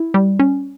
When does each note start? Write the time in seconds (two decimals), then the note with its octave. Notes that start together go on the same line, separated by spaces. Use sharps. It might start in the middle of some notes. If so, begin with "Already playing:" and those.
Already playing: E4
0.14 G3
0.39 C#4